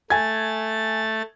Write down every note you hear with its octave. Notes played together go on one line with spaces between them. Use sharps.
A3 G#5 G#6 A6